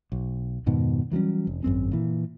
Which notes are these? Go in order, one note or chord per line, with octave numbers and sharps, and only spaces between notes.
B1
F2 G#2 B2 D#3
E3 F#3 G3 C#4
F1
G#1 F#2 C4 C#4
A#2 E3